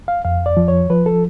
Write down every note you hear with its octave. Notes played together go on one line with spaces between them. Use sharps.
F5
F2 F5
D5
F3
C#5
F3 B4
A4